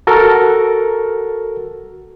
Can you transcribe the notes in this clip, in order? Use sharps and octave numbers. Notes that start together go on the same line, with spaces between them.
F#4 A4 A#4